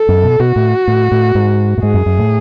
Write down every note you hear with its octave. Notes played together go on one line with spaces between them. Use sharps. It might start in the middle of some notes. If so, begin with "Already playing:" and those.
Already playing: A4
F#2
B2
B2 F#4
A2
A2
A2
G#2
A2
G#2 G#4
F#2
F#2
A2